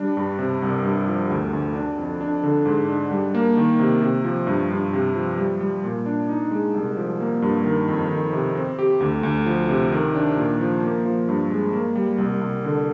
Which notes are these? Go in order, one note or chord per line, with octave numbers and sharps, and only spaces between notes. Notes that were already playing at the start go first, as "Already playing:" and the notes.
Already playing: G3 D4
G2
C3
C2
G2
F3
D2
D2
D4
F2
D4
D3
G#2
D4
G3
A#3
D#3
C3
C3
F3
G2
G2
C3
F3
G3
G3
A#2
D4
D#4
G#3
C2
F3
A#3
G2
D#3
F2
D#3
C3
C4
G4
D2
D2
F3
C3
D#3
D4
A#2
F3
A#3
F3
G2
G#3
A#3
G3
C2
C2
D3